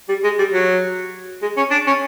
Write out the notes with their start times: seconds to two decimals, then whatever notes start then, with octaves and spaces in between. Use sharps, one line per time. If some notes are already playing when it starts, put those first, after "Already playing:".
0.09 G3
0.24 G#3
0.39 G3
0.53 F#3
1.42 G#3
1.57 C#4
1.71 D4
1.87 C#4